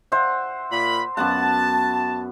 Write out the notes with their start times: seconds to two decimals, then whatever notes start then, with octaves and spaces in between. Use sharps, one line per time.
0.12 C5 E5 F#5
0.72 A#2 B5
1.17 F#2 B3 F#5 A5